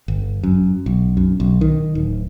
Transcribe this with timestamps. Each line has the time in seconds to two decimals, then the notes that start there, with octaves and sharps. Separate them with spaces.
0.08 G1
0.43 F#2
0.86 B1
1.17 F#2
1.40 B1
1.61 D#3
1.95 D1